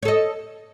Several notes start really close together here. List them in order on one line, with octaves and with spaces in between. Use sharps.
C#5 A4 D#5